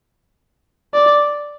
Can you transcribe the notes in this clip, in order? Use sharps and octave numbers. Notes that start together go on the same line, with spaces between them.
D5